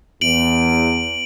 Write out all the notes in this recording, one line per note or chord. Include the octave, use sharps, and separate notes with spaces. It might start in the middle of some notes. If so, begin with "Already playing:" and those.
E2 D7 F#7